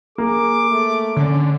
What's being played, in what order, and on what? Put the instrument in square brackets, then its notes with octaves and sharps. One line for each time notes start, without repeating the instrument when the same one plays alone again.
[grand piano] A#3 [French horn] G#4 [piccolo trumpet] D6
[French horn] A3
[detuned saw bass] D3 [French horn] C#4